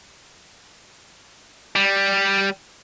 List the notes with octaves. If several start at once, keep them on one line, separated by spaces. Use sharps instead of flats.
G3